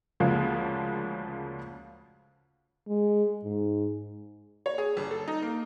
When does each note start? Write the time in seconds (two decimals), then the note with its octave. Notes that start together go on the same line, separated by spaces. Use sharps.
0.20 D2 C#3 F3 G#3 A#3
2.88 G#3
3.44 G#2
4.66 C#5
4.78 G#4
4.97 G1
5.11 A4
5.28 D#4
5.42 A#3